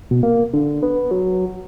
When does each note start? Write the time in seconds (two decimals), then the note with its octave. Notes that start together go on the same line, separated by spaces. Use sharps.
0.11 B2
0.23 A#3
0.53 D3
0.83 B3
1.11 F#3